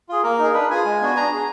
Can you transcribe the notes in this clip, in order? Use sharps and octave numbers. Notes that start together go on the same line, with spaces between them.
F4 G#4
A#3 A#4
D#4 G#4
D4 B4
F4 G#4 G#5
G#3
B3 D4 F#4
D4 A#5
G#4